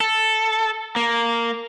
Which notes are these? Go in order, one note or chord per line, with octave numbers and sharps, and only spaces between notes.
A4
A#3